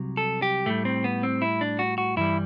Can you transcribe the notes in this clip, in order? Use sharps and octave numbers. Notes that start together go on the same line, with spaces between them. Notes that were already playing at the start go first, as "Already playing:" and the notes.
Already playing: C2 C3 F#3
A4
G4
A2 G3 A3
C4
B3
C4
E4
D4
F#4
F#4
G2 E3 G3 E4